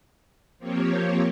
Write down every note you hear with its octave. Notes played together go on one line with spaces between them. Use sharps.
F3 A#3 C4 G4 C#5